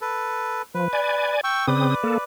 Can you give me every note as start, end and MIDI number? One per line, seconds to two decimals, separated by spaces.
0.01 0.62 69
0.01 0.62 71
0.74 0.88 53
0.74 1.35 71
0.93 1.41 74
0.93 1.41 80
1.44 1.66 79
1.44 1.66 85
1.44 1.66 88
1.68 1.95 49
1.68 1.95 60
1.68 2.24 71
1.68 2.24 74
1.68 1.95 87
2.04 2.18 58
2.04 2.18 69